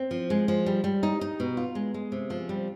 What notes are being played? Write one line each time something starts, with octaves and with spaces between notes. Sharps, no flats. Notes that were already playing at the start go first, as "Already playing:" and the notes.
Already playing: C4
F3
G#3
F3
G3
G3
D#4
D#4
B2
F4
G#3
G#3
C3
F3
G3